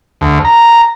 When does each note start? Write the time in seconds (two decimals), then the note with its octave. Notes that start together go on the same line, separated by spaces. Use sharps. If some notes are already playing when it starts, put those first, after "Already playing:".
0.21 D2
0.45 A#5